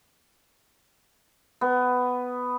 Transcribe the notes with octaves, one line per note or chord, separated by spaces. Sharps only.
B3